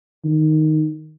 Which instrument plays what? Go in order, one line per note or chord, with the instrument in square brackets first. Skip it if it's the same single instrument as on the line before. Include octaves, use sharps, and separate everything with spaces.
[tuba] D#3